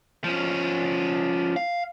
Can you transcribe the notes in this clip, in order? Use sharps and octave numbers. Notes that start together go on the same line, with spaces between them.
F3 C#4
F5